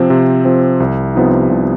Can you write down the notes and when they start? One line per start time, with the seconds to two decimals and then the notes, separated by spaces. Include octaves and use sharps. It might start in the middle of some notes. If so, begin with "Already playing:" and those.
Already playing: C3 F3 C4
0.10 C3
0.45 F3 C4
0.80 C2
1.15 C3 F3 B3 D#4
1.50 C2